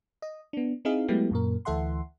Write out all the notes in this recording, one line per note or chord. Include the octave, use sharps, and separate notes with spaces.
D#5
B3 D4
C4 D#4 E4 G#4 F5
F#3 G#3 A3 B3 E4 G4
F#2 A#2 A#4
D2 E3 A4 E5 F#5 C6